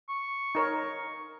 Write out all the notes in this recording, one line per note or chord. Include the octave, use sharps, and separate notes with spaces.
C#6
D#4 A#4 C#5